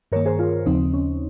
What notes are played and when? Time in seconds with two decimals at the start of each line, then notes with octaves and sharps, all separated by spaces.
0.12 G2 D#3 A#3 A#4 C#5
0.26 G#4 C5
0.39 F4 G#4
0.66 D#2 C#3 F3 C4 D#4
0.94 C#4